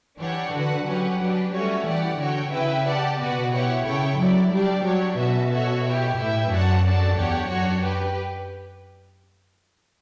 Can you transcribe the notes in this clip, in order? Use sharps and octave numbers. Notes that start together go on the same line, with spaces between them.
E3 D4 G4 C#5 F#5
D3 F#4 B4 F#5
F#3 C#4 G4 B4 F#5
F#3 D4 G4 B4
G3 A3 C#4 F#4 C#5
E3 G4 D5 F#5
D3 F#4 C#5 G5
C#3 E4 B4 E5 G5
G4 D5 F#5 A5
B2 B3 F#4 B4 D5 F#5
E4 G4 C#5 F#5
C#3 E4 A4 C#5 G5
F#3 E4 A4 D5
G3 D4 G4 D5
F#3 D4 G4 C#5
B2 C#4 F#4 B4 E5 A5
F#4 A4 C#5 E5
E4 G4 C#5
A2 E4 B4 E5 G5
F#2 D4 F#4 C#5 F#5 A5
D4 F#4 A4 D5 A5
E2 D4 G4 C#5 F#5
F#2 D4 F#4 C#5
G4 B4